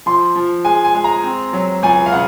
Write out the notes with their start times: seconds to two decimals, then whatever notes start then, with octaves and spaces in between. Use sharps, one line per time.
0.06 F3 C6
0.36 F3
0.65 G#3 G#5
0.84 G#5
0.95 G#3
1.04 A#5
1.24 C4
1.53 F#3
1.83 C#2 G#5
2.06 F5
2.13 C#3 F#5